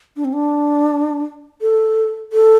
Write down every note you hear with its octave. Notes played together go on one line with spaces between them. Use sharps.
D4
C4
D4
A4
A4